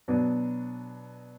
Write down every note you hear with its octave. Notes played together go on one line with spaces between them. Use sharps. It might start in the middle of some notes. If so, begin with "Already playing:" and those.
B2 F#3 B3 D4